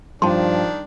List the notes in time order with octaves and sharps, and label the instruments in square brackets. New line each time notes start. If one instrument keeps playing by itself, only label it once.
[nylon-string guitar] G2 [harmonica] D#3 D4 [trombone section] F3 [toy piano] A5 C6